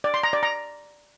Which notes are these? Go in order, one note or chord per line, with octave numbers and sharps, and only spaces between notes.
D5
C6
A#5
D5
A#5